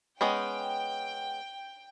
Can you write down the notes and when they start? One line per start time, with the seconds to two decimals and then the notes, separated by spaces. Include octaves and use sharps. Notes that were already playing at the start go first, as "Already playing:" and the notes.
0.21 G#3 B3 C#4 G5